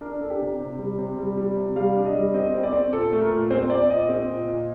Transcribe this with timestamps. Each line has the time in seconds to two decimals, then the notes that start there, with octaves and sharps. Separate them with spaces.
0.01 D4 A#4
0.21 D4 A4
0.30 G4
0.41 C3
0.60 C3
0.79 G3
0.98 C3
1.18 G3
1.37 G3
1.56 C3
1.76 G3 F5
1.95 D4
2.05 D#5
2.15 G3
2.34 C4 D#5
2.54 C4
2.63 D5
2.73 C4
2.93 A#2 A4
3.13 A3
3.21 A#4
3.31 A#2
3.50 C4 C5
3.70 C4 D5
3.90 A#2 D#5
4.09 C4
4.28 A#2
4.48 A#2